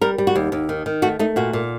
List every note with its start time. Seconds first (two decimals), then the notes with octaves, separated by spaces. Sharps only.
0.01 G3 A#4
0.18 G3
0.27 F#4
0.35 D#2
0.52 D#2
0.69 D#3
0.86 D#3
1.02 A3 F#4
1.19 A3 D#4
1.36 A#2 F#4
1.53 A#2